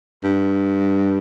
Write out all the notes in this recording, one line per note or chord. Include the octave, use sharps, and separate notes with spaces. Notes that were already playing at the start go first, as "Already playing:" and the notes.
G2